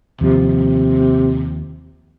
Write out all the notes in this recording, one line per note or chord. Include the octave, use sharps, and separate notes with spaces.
D#2 C3 F3